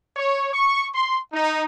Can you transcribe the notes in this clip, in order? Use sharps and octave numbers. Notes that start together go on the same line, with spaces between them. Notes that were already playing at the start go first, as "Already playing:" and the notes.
C#5
C#6
C6
D#4